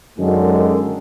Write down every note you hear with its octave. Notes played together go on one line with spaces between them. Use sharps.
F#2 D3 D#3 G#3